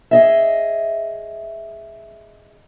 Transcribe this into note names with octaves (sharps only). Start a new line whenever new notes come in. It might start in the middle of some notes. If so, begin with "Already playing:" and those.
G#4 D#5 E5